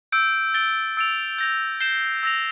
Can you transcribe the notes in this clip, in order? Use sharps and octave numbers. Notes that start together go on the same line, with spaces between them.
E6 G6 D7
A6 D7 G7
E6 A6 D7 F7
G6 A#6 F7
G6 C7 E7 G7
E6 A#6 F7